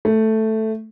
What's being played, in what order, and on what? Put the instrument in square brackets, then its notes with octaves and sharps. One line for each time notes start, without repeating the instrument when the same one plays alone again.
[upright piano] A3